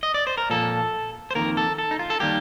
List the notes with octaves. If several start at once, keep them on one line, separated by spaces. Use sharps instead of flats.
D#5
D5
C5
A#4
A#2 F3 A#3 A4
C5
F2 C3 D#3 A#3 A#4
A4
A4
D#4
F4
A4
D#3 G3 A#3 G4